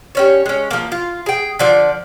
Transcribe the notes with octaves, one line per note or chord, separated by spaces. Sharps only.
G3 C#4 C#5
G#3 C#4
F3 A#3
F4
G#4 G5
D3 F3 D5